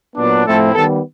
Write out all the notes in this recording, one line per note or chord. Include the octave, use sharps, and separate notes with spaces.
A#2 F#3 B3 D4
A2 F3 A3 C4 E4 A4
D#3 G3 B3 A4